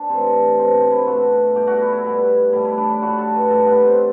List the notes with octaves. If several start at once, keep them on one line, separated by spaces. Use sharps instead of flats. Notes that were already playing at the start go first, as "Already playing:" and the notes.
Already playing: D4
C3 E3 A3 C4
B2 A3 C4
C4
E4
B2 A3 F#4
B2 G3 G4
F#4
E4
E4
B2 G3
A2 G3 E4
E4
D4
E4
A2 G3 F#4
A4
B4
A2 G3 A4
B3
C4